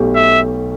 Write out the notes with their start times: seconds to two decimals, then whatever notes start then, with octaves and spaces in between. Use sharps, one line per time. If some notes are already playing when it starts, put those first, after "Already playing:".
Already playing: B1 B2 A3 G4
0.15 E5